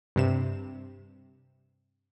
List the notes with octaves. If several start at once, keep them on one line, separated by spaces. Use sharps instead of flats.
G2 C3 E7